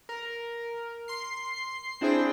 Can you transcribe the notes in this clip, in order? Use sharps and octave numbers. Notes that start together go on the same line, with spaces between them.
A#4
C6 C7
C4 D4 E4 G#4 C5 G5